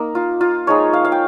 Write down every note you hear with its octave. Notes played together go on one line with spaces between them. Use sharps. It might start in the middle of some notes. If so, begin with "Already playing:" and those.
Already playing: A#3 D#4
F4
F4
F3 G#3 D#4 C#5
F5
F5
G5